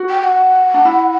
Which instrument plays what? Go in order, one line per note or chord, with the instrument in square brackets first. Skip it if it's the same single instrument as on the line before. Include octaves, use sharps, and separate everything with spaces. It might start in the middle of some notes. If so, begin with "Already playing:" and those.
Already playing: [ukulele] F#4
[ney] G5
F#5
[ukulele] D4
E4